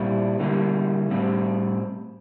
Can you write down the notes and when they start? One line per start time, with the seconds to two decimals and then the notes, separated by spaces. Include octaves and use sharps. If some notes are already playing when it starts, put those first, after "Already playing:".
Already playing: A#2 G3 C4 E4
0.40 D3 G3 A#3 E4
1.11 A2 G3 C4